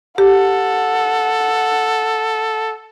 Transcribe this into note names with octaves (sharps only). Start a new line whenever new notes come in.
G4 A4 F#5